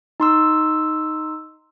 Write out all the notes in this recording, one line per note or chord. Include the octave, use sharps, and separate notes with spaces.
D#4 C6 E6